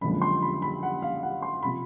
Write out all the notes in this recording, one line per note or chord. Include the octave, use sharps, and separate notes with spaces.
F#1 F2 D3 F3 G#3 B5
C6
B5
B5
F#5
F5
F#5
C6
C3 F3 B5